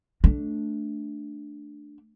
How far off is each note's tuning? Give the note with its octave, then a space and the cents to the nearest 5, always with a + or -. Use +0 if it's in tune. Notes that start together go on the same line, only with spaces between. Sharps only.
A3 +0 D4 +0